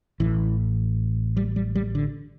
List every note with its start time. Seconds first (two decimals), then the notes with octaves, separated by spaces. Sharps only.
0.20 A1 A2 E3
1.37 G3
1.56 G3
1.75 G3
1.95 D3